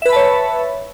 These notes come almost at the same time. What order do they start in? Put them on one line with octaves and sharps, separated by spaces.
E5 B4 B5 A5 C#5